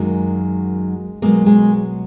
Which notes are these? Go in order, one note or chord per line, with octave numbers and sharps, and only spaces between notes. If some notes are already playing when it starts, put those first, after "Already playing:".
Already playing: F#2 D#3 F#3 G#3 A#3
B2 F#3 G#3 A#3
G#3